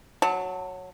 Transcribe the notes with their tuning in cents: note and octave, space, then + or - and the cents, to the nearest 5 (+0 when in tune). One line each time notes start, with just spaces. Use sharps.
F#3 -5 A5 +25